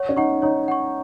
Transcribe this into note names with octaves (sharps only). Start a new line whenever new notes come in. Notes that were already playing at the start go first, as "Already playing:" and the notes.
Already playing: C#5 F#5 C#6
C#4
D#4 F#5 C#6
D#4 C#5
F#5 C#6